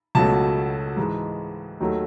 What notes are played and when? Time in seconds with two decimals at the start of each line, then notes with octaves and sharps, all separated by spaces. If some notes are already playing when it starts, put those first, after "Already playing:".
0.15 C#2 B2 F#3 A3 A5
0.97 G#2 E3 G#3
1.80 D#2 D#3 F#3 A3